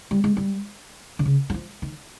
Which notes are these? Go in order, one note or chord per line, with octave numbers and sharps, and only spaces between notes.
G3
G#3
G3
D3
C#3
F#3
F3
D#3